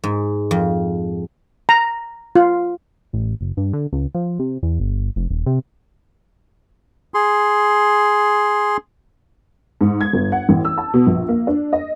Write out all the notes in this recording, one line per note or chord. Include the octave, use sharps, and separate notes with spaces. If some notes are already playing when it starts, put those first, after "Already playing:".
G#2
F2
A#5
F4
A1
F#1
G2
D3
C#2
F3
C3
E2
G1
F1
D#1
C3
G#4 C6
G#2
G#6
G1
F#5
A1
E6
A5
B2
A#1
A#3
D4
D#5